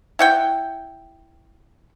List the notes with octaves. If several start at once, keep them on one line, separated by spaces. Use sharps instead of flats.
E4 F#5 G5